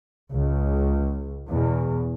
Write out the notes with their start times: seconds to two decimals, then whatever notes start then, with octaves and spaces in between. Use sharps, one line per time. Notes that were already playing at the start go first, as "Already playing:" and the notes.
0.33 C#2
1.50 E2 B2